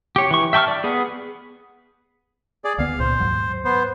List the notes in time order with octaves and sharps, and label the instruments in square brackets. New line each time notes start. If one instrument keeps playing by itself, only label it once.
[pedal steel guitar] G4 C#5
E3 C#6
E5 G5 A5 C#6 F6
D5
B3 G#4
[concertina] G#4 D5
[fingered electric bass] D2 B3 [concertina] F5
[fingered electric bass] C#2 A#2 [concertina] C5
[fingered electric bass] D#2 G#2 F#3
[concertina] B3 C5